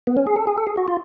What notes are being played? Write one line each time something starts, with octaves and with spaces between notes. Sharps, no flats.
B3
C#4
G#4
A4
G#4
A4
G#4
F#4
F4